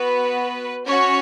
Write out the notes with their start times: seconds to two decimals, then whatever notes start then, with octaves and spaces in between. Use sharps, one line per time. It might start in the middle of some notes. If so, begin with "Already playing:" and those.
Already playing: B3 F#4 B4
0.86 C#4 F#4 C#5